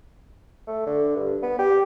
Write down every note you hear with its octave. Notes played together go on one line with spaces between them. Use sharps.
A3
D3
G2
B3
G4